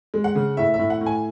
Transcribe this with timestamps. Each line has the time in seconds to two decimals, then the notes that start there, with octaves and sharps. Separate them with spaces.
0.14 G#3
0.24 F#5
0.35 C#3
0.57 A2 E5
0.74 E5
0.79 A2
0.90 F#5
1.01 A2
1.06 G#5